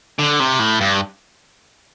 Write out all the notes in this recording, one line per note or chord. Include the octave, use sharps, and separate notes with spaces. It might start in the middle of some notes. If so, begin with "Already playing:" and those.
D3
C3
A2
G2